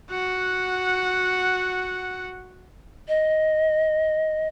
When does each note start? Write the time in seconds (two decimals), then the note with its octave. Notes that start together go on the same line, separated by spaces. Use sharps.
0.11 F#4 F#5
3.08 D#5